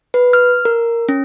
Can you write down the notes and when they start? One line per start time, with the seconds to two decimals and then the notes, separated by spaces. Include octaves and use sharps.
0.14 B4
0.33 F6
0.65 A#4
1.09 C#4